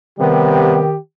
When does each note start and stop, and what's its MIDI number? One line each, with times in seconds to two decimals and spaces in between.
0.19 0.84 48
0.19 0.95 51
0.19 0.84 55
0.19 0.84 59
0.19 0.98 67